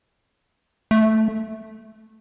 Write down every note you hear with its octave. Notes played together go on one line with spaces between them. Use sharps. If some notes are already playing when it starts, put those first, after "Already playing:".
A3